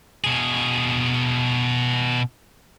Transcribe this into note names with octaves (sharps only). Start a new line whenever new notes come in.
B2 G#4